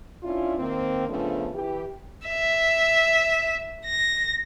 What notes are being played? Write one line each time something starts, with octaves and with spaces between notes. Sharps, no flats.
C#4 D4 E4 F4
D#3 A#3 C4
C#3 F3 A3 B3 D4
E3 G4
E5
A#6